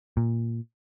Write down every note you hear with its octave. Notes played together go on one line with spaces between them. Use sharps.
A#2